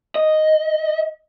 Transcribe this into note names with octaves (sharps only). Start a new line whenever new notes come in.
D#5